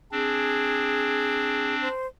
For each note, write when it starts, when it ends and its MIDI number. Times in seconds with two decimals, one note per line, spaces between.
0.12 1.88 60
0.12 1.88 62
0.12 1.75 68
1.82 2.07 72